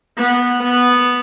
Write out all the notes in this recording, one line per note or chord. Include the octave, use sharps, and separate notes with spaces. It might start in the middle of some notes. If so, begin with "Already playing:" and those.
B3
B3